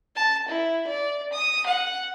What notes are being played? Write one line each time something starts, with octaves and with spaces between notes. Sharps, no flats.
A5
E4
D5
D#6
F#5